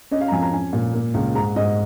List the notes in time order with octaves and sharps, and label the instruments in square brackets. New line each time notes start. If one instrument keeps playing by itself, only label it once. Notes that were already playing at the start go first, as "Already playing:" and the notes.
[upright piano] C#4 D#5
F5
A#5
F2 G#5
A#5
C#4 G#5
A#2
A#3
C#2
G#2 A#5
G#2 D#5